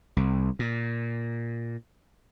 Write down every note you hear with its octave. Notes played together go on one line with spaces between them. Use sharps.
C2
A#2